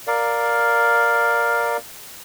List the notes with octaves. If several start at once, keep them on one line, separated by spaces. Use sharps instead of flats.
A#4 D5 F5